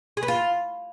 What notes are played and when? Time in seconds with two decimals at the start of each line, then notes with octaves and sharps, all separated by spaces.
0.17 G#4
0.23 B4
0.28 F4